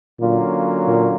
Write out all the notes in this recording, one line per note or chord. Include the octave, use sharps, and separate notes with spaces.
A#2 D3 F#3 A#3 C#4 F4
A#2